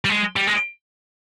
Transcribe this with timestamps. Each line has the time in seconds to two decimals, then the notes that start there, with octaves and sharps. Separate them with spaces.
0.05 G3
0.09 G#3
0.36 G3
0.47 G#3